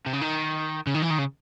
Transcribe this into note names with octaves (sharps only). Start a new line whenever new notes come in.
C3
C#3
D#3
C#3
D#3
E3
D#3
C#3